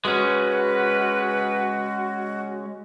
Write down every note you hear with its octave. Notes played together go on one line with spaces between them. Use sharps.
G#3 C#4 F#4 B4